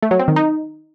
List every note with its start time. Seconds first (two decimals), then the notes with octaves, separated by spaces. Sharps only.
0.02 A3
0.11 F#3
0.19 C4
0.28 D#3
0.36 D#4